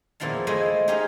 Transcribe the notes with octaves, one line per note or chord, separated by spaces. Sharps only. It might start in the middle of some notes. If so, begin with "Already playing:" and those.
E2 A#2 F3 E4 F5 A5
G#3 A3 E4 G#4 C5 D#5
D#4 G4 G#4 C5 D#5 F5